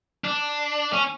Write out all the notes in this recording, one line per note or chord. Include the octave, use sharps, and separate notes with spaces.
D4
C#4